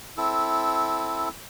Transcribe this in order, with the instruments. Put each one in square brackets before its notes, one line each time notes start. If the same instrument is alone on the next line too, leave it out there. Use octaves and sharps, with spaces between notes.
[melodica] C4 E4 A4